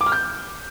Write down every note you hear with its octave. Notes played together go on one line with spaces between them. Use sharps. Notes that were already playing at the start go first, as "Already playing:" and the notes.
D6
F6
G6